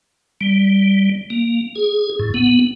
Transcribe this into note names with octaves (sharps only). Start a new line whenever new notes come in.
G3
A#3
G#4
A2
B3